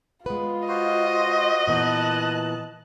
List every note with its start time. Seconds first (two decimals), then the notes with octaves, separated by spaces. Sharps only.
0.26 G#3 B3 F4 B4
0.68 F#4 C5 D#5 C6
1.67 A#2 E3 B3 A5 F#6
2.34 D#5